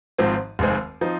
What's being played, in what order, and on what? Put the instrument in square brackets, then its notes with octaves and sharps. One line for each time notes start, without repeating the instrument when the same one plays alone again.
[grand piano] G#1 G#2 F3 C4
F1 D#2 D#3 G#3 C4
F3 C4 D#4